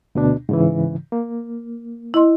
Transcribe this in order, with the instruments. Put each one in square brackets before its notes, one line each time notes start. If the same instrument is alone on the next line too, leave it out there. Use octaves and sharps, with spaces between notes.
[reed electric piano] D2 B2 D4
G#2 C#3 E3
A#3
[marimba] E4 D#5 C6